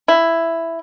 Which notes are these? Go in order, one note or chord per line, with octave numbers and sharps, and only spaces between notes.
E4